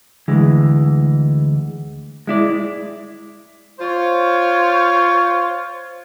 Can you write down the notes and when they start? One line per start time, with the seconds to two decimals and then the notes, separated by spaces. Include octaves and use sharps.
0.28 D2 E3 G#3
2.27 G#3 E4 D5
3.79 F4 C5 C#5